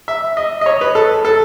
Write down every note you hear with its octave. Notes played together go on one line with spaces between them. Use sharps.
E5
D#5
D#5
C#5
B4
A4
A4